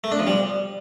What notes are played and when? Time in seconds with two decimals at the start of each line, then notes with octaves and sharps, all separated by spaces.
0.04 A3
0.11 D4
0.19 F3
0.27 G3